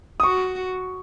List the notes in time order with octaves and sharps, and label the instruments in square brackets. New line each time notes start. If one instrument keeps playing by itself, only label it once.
[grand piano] D#6
[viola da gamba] F#4 [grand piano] C#6